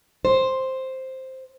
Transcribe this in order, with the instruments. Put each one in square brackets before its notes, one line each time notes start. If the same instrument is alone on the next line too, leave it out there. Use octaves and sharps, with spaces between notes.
[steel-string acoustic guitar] C5